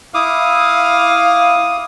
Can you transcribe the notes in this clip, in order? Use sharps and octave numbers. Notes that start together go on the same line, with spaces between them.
E4 F5 D6 D#6